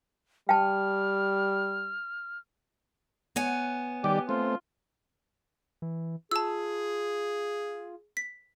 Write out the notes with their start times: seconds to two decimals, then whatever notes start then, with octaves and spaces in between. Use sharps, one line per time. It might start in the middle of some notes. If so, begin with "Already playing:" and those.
0.49 G3 G5 A5 F6
3.36 B3 C#5 G#5
4.04 D#3 G3 G4 D5
4.29 A3 C4 F4
5.82 E3
6.31 F4 G#4 A5 E6
8.17 B6